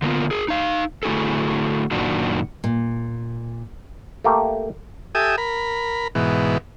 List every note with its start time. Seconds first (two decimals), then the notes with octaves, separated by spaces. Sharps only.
0.02 D3 A#3 B3 F4
0.31 G#4 A#4
0.48 D#4 F5
1.03 D3 A3 E4 F#4 G#4 A4
1.91 F#2 A#2 D#3 D4 F#4
2.64 A#2
4.24 A3 A#3 G4
5.15 G4 A4 E5 G#5 D#6
5.38 A#4 B5
6.15 G#2 B2 E3